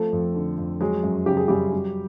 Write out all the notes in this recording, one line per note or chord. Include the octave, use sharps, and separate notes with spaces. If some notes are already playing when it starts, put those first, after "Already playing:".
Already playing: F3 A3 C4 A4
F2
D3
F2
F#3 G#3 G#4
F#2
C#3 G4
G#4
F#2 G3 G4
F#3